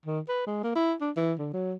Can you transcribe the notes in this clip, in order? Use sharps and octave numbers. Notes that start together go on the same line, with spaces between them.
D#3
B4
G#3
A#3
E4
D4
E3
D3
F#3